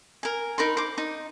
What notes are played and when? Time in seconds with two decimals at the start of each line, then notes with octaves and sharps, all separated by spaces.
0.23 A#4 G#5
0.58 D#4 A#4 B5 C6
0.77 C5 D6
0.98 D#4